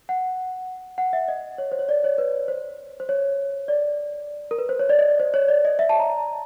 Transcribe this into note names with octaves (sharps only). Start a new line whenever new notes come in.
F#5
F#5
E5
D#5
C#5
C5
C#5
D5
C#5
B4
C5
C5
C#5
D5
A#4
B4
C5
C#5
D5
D#5
D5
C5
C#5
D5
D#5
E5
A5
A#5